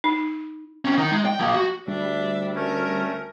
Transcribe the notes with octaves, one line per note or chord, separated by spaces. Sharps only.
D#4
C4 C#4
D#3 D#4
G#3
G5
F3 A#3
F#4
D2 G3 D4 E5
A3 C#4 A#4